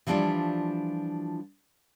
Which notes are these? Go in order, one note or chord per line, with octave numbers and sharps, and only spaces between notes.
E3 F3 G3 D4 E4 F4